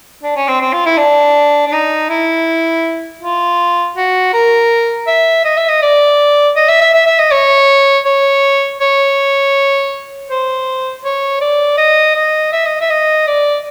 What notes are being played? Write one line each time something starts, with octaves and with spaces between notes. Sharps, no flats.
D4
C#4
C4
C4
F4
E4
D4
D4
D#4
E4
F4
F#4
A#4
E5
D#5
E5
D#5
D5
D#5
E5
E5
E5
E5
D#5
C#5
C#5
C#5
C5
C#5
D5
D#5
D#5
E5
D#5
E5
D#5
D5